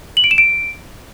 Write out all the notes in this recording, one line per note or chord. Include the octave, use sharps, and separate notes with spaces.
F#7
D7
E7
D7